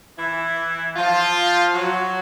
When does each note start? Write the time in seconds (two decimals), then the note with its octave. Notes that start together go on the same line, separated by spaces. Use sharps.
0.17 E3 E4
0.96 F3 F4
1.75 F#3 F#4